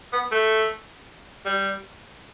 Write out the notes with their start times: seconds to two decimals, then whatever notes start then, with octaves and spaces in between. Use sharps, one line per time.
0.13 B3
0.32 A3
1.45 G3